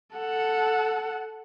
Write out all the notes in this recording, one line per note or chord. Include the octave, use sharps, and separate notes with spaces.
A4 F#5